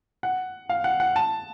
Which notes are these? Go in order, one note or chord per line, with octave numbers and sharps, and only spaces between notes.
F#5
F5
F#5
F#5
A5